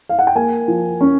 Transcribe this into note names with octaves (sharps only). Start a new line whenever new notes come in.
F5
F#5
G5
A#3 G#5
F3
C#4